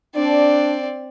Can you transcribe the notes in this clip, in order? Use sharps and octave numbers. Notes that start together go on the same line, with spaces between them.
C4 D4 D5